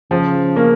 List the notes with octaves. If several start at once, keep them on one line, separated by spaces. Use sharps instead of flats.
C#3 F3
A#3 C#4